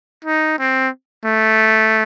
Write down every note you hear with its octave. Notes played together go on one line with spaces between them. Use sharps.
D#4
C4
A3